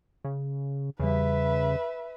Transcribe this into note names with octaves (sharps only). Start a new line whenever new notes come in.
C#3
E2 C#3 G3 B4 E5